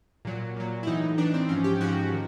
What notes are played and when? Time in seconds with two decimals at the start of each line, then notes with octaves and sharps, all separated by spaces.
0.25 A#2 F#3
0.56 A#2 F#3
0.83 E4
0.87 A2 E3 D#4
1.18 A2 E3 D4
1.34 C4
1.49 G#2 F3 C#4
1.64 G4
1.80 G#2 F3 F#4
2.12 D#3